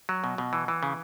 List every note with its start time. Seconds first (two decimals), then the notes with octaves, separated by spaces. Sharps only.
0.09 F#3
0.24 B2
0.38 B2
0.53 E3
0.68 E3
0.83 C#3